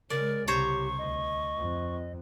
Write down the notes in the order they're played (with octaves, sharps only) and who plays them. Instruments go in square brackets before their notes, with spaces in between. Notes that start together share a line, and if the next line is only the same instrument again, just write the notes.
[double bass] C#3 G#3 [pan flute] A#4 [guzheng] D5
[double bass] C2 C#3 [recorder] G4 [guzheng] C5 C#5 A#5 [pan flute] C#6
[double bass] D2 [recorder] D#5
[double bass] F2